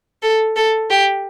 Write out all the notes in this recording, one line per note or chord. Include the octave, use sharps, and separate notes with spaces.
A4
A4
G4